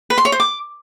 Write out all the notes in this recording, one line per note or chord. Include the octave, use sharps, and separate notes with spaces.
B4
C6
C#5
C5
D6